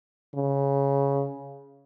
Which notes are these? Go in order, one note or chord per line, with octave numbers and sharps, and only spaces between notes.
C#3